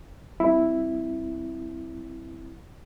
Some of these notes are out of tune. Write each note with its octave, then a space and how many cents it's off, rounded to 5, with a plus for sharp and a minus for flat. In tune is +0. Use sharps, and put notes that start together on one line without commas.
G3 +0 C4 +0 E4 +0